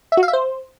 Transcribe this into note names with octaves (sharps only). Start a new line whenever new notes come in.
E5
F#4
F5
E5
C5